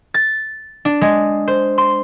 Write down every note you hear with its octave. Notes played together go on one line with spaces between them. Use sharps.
A6
D4
G#3
C5
C6